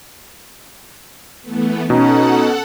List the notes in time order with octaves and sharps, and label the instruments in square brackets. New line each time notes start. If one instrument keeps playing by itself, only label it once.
[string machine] E3 A3 B3
[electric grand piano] B2 [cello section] C#4 [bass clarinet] D#4 [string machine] A4 F#5